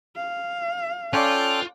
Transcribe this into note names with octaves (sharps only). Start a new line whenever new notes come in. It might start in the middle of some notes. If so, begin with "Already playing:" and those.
F5
C#4 F4 A4 C#5 D5 G5 F#6